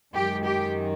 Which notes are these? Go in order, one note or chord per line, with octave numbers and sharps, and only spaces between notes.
F#2 D#3 G#3 G4
G4